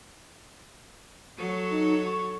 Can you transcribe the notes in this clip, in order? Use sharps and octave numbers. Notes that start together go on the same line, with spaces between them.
F#3 A4 C#5
D#4
C#6